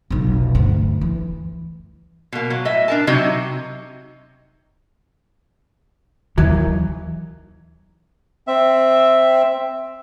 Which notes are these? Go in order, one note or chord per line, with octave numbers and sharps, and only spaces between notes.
F1 B1
D2 G2
E3
B2 A#3
F#3
A2 D#5 E5
D4 A#4 A5
C3 F#3 D#4
D#2 D#3 E3 F#3
C4 E5